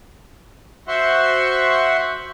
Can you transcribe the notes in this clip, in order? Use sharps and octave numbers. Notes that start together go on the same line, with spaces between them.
F#4 C5 E5 F#5 C6 C#6